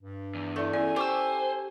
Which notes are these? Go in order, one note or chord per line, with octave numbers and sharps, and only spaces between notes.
G2
E2
A3 E4 D5 E5
C#4 E4 A4 D5 G#5
G4 C5 C#6 E6